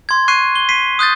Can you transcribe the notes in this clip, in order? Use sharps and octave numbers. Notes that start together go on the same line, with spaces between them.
C6 G#6
C#6 F#6 C7 D#7
G7
B6 C7 D#7
D#6 F#6 G6 A6